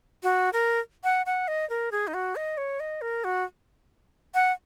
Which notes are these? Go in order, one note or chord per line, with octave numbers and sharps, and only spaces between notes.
F#4
A#4
F#5
F#5
D#5
A#4
G#4
D#4
F#4
D#5
C#5
D#5
A#4
F#4
F#5